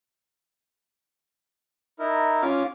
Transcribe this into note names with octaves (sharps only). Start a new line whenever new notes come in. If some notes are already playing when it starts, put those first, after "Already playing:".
D#4 E4 A#4
C#4 F4 D6